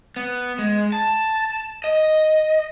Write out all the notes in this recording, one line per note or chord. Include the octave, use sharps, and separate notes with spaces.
B3
G#3
A5
D#5